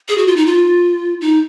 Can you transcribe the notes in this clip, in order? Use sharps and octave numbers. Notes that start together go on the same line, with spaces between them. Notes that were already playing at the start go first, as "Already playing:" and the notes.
G#4
F#4
F4
D#4
F4
D#4